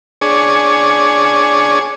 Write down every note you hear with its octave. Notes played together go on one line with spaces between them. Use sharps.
D4 G#4 C#5